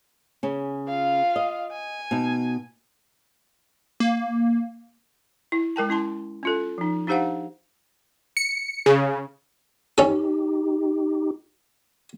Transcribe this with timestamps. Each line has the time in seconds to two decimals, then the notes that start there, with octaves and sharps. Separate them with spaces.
0.43 C#3 C#4
0.87 F4 F5
1.36 D#5
1.71 G#5
2.11 B2 D#4
4.00 A#3
5.52 E4
5.76 G#3 A#4 G5 A5
5.89 C#4 E4 A5 C6
6.43 C#4 F4 A4
6.78 F3 D#4
7.07 D4 D#4 G4 C5 F5 F#5
8.37 C#7
8.86 C#3
9.98 C#4 D#4 G4 A4